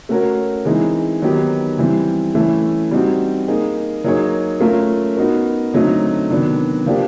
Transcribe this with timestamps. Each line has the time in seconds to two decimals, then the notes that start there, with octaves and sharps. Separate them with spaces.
0.09 A3 C#4 F#4 A#4 C#5
0.65 E3 G#3 C4 D#4
1.22 D#3 F#3 B3 D#4 G4
1.78 E3 G3 C4
2.35 E3 A3 C#4
2.91 G3 C4 D#4 F#4
3.48 A#3 D#4 G#4
4.04 F#3 A#3 D#4 G#4 C#5
4.60 A3 C#4 F4 A#4
5.17 B3 D#4 F#4 A#4
5.73 D3 F#3 A3 C4 D#4
6.30 C3 D#3 F#3 B3 D4
6.86 F3 A#3 D4 G4